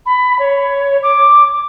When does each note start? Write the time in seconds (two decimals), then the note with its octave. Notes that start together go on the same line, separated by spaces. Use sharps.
0.06 B5
0.39 C#5
1.03 D6